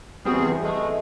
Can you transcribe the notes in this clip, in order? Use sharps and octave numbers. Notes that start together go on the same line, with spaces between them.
E2 G3 C4 F#4 G#4
E3
G#3 A3